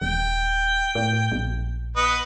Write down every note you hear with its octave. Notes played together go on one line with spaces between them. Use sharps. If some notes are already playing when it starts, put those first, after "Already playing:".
D#1 G5
A2
A#1
B3 B4 D#5